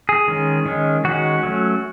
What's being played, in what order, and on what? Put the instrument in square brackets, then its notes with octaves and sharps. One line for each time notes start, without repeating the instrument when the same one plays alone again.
[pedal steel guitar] G#4
D#3 G#3 C#4
D#3 G#3 C#4
D#3 G#3 C#4 F#4
F#3 A3 C#4